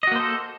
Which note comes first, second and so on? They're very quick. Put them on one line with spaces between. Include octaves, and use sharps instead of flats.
D#5 F#4 A#3 C5 A4